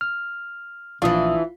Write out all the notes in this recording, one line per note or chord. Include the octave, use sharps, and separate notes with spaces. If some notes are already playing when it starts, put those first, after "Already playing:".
F6
A#1 E3 D4 F4 D#6